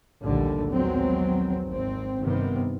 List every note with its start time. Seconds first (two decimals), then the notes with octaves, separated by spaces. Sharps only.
0.23 A#1 D#2 A2 D3 G3
0.70 A#1 D#2 F#3 G#3 B3 C4
1.67 G#1 C4
2.21 G2 C3 D#3 B3 C4